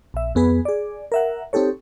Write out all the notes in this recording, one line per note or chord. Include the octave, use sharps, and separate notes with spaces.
A#1 E5
F2 B3 G#4 B4
G#4 D5
A#4 E5 F#5
C4 D#4 G4 A4 C#5